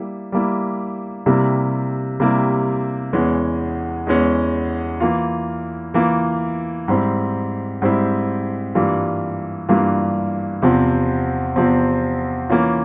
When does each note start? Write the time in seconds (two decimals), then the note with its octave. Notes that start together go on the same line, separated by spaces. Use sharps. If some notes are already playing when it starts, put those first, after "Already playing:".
Already playing: G3 A#3 E4
0.32 G3 A#3 E4
1.26 C3 G3 A#3 E4
2.20 C3 G3 A#3 E4
3.13 E2 E3 G#3 C#4
4.07 E2 E3 G#3 C#4
5.00 E3 A#3 F4
5.94 E3 A#3 F4
6.88 G#2 G3 C4 E4
7.82 G#2 G3 C4 E4
8.75 G2 E3 G3 A#3 F4
9.69 G2 E3 G3 A#3 F4
10.62 E2 C3 F3 C4
11.56 E2 C3 F3 C4
12.50 E3 A#3 C#4 F4